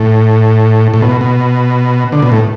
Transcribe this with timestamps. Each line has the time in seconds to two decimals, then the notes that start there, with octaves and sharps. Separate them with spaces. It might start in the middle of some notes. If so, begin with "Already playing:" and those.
Already playing: A2
0.94 A2
1.02 B2
1.21 B2
2.12 D3
2.22 B2
2.32 A2